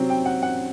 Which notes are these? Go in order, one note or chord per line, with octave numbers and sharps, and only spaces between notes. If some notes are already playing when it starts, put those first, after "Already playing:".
Already playing: C3 F#3 C4
G5
F#5
F#5